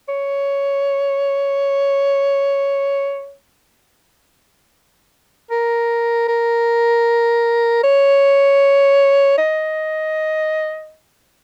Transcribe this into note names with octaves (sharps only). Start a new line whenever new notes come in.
C#5
A#4
A#4
C#5
D#5